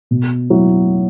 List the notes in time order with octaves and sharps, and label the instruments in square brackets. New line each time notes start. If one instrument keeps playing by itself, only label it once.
[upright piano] B2
F#3 E4